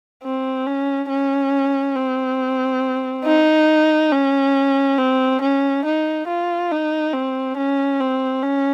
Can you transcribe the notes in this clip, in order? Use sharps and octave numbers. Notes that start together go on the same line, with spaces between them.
C4
C#4
C#4
C4
D#4
C#4
C4
C#4
D#4
F4
D#4
C4
C#4
C4
C#4